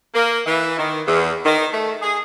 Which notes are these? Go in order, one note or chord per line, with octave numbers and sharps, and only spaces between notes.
A#3
E3
D#3
E2
D#3
A3
G#4